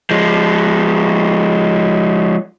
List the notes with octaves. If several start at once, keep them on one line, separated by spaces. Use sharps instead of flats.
F3 G#3